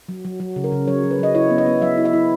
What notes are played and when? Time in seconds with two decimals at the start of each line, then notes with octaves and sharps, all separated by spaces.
0.09 F#3
0.25 F#3
0.40 F#3
0.56 C#3
0.64 A#4
0.72 C#3
0.88 F#3 C#5
1.04 F#3
1.11 B4
1.19 F#3 D#5
1.35 E4 C#5
1.50 B3
1.58 D#5
1.66 B3
1.82 F#3 E5
1.98 E4
2.05 E5
2.13 E4